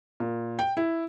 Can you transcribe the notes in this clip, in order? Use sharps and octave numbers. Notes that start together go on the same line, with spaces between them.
A#2
G5
E4